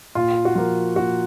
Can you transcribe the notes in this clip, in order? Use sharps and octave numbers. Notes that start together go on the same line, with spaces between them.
A#2 F4
F#4
F3 A#3 F4
A#2 F#4